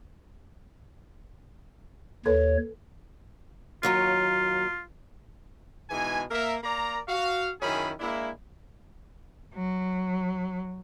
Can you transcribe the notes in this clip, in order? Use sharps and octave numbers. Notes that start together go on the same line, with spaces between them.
D#2 A4 B4 C#5
D#2 F#3 F4 C#5
G#2 B2 E3 G#3 G#5
A#3 A#4 E5
A#3 A#4 D5 A#5
F#4 F5
F#2 D#3 C#4 E4 G#4 B5
G#3 A#3 D4 E4
F#3